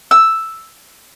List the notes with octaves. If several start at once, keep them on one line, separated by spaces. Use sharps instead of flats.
E6